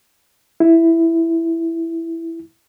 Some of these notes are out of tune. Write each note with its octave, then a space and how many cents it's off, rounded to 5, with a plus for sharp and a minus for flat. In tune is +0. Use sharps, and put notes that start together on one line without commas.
E4 +5